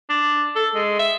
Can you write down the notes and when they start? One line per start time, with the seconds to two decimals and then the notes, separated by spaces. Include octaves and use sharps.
0.10 D4
0.56 A4
0.75 G#3
0.99 E5